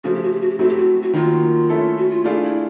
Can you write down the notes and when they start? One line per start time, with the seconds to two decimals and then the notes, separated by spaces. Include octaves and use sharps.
0.04 C#3 F3 A3 F#4
0.14 G4
0.23 F#4
0.31 G4
0.41 F#4
0.50 G4
0.59 F#3 A3 C4 E4 F#4
0.68 G4
0.77 F#4
1.02 F#4
1.14 D#3 F#3 A#3 F4
1.69 A3 C#4 E4 A4
1.97 F#4
2.10 F4
2.24 A3 D4 E4 F4 G#4
2.42 E4